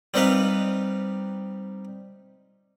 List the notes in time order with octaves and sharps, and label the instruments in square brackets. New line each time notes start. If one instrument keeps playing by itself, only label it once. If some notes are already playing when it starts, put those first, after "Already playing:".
[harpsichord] G3 C4 D#4 B4 F5